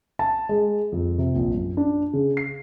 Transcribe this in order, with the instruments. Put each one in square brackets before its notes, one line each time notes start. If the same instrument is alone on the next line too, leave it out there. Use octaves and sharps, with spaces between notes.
[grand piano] A5
G#3
F2
C3
A#1
F#2
D4
C#3
C7